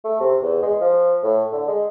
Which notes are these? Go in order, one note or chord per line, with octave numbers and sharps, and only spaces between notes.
A3
C3
E2
G#3
F3
A2
D3
G#3